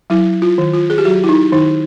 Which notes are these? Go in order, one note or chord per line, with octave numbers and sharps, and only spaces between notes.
F#3 E4
F4
D#3
F4
G#4
G4
F#3 F#4
E4
D#4
D#3 D#4